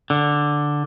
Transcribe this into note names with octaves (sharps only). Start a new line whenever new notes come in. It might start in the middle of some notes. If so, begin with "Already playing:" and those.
D3